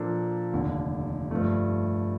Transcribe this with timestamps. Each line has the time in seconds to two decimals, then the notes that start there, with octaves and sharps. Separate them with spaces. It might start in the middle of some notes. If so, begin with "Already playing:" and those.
Already playing: A#2 F3 A#3 D4 A4
0.53 F1 D#2 D3
1.31 G2 F3 A3